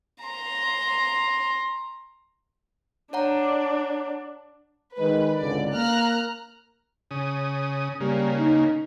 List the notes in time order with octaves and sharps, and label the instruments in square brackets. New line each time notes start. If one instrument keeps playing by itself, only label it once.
[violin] A#5 C6
[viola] D4 [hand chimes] C#5 F#5 A#5
[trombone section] D#3 G#3 [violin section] B4
[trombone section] G#1 C#2 D3 [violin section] D5
[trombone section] A#3 [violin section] A#5 F6 F#6
[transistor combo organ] C#3 D#6
[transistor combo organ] C#3 A#3 [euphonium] G3
[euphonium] D#4